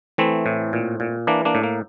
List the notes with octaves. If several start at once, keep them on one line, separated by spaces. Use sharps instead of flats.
E3 A3 C4
A2
A#2
A#2
E3 A#3 D4
A#3 D4
A2
A#3